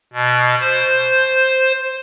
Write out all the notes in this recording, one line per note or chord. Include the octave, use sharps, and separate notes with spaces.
B2
C5